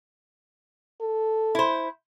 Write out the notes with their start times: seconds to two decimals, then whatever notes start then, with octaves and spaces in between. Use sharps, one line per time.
1.01 A4
1.55 E4 C5